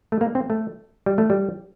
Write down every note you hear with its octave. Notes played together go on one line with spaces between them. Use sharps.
A3
A#3
C4
A3
G3
A3
G3